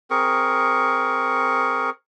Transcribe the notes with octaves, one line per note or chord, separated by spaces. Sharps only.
C4 G#4 A#4 C#6